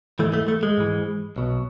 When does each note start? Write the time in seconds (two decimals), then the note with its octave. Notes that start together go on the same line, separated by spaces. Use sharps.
0.19 G#2 E3 A3
0.34 A3
0.48 A3
0.63 G#3
0.78 G#2 E3
1.36 B1 B2